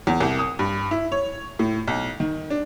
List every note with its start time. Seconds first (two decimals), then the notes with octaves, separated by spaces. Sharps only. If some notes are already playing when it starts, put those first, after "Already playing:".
0.07 E2
0.20 C2
0.39 D#6
0.59 G2
0.91 E4
1.12 C#5
1.59 A2
1.87 B1
2.20 D#3
2.50 D4